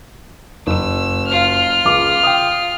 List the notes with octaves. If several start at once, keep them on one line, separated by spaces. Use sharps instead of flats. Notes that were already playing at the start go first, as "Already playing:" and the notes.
F#1 E6
F4 F6
C#2 G#3 D6
G5 D#6